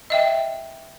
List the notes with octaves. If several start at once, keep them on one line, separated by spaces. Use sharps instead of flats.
D#5 E5 G5